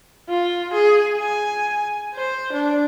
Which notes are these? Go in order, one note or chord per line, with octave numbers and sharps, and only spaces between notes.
F4
G#4
G#5
C5
D4